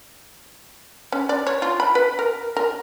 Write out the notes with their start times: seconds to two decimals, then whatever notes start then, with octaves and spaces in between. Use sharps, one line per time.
1.12 C#4
1.29 D5
1.47 C#5
1.62 F4
1.80 B5
1.95 B4
2.19 A#4
2.57 A#4